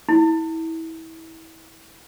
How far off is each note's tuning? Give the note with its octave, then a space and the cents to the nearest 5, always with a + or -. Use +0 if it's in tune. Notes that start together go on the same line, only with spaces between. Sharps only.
E4 -25